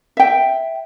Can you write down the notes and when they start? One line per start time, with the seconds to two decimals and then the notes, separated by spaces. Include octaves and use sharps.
0.17 E5 G5